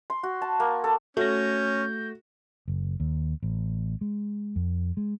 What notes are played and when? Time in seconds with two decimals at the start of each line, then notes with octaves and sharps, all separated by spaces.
0.10 C6
0.23 F#4
0.42 A5
0.60 A#3
0.84 A4
1.17 A3 C#4 F#4 G6 A#6
2.68 F#1
3.00 D#2
3.43 A1
4.01 G#3
4.56 F2
4.97 G#3